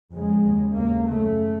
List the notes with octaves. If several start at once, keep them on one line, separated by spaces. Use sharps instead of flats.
F2 C#3 G#3
D#2 C#3
D#2 C#3 A#3
F#2 C#3 A3